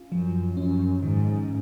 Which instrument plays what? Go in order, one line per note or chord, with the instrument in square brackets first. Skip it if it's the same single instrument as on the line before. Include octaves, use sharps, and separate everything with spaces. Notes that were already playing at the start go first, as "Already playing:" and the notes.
Already playing: [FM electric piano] C#4 F4
[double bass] F#2 [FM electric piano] F3
[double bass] F#2 [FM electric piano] C#4
[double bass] G#2 [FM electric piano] D#3